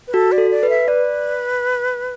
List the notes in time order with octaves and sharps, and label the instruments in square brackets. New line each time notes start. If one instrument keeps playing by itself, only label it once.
[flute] B4
[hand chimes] F#4 [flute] A4
[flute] D5
[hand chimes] A4
[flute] D5
[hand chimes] B4
[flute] E5
[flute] B4 [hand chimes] D5